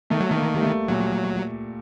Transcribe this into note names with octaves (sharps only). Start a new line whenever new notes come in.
D#3 A3
F#3
D#3 A3
A#3
G3
A3
A#2 F#3